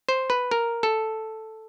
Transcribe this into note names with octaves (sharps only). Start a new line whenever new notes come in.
C5
B4
A#4
A4